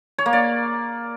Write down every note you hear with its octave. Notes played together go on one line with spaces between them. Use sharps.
C#5
A#3
D5